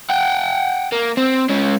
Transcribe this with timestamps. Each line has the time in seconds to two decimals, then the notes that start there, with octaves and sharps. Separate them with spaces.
0.09 F#5 G5
0.92 A#3
1.17 C4
1.50 G#3 C#4